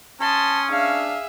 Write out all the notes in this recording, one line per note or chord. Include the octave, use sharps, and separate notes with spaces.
C#4 A5 C6 D#6
D4 G#4 E5 F5